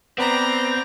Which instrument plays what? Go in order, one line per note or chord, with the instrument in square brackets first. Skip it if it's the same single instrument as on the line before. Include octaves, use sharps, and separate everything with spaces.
[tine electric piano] B3 B4 B5 [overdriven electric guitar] C4 [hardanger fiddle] D5 A#5